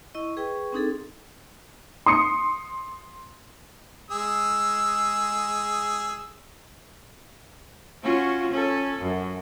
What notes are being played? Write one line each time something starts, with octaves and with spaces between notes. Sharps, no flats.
E4 D#5 C#6
G#4 B4 G5 C#6
C4 D4 D#4 G#4 A4
C6 D#6 C#7
G#3 G#4 E6
C#4 F4 F#4
C#4 A4
F#2